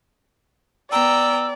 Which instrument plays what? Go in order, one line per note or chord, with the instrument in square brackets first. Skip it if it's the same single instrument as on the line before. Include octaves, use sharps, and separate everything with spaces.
[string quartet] B3 G5 A#5 [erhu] D5 [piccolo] E6